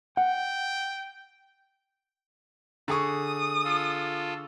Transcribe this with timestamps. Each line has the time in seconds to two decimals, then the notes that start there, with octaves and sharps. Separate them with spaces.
0.17 F#5 G5
2.88 D3 G#4 C#6 D#6
3.65 F4 A4